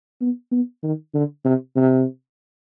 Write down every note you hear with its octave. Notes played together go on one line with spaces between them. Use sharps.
B3
B3
D#3
D3
C3
C3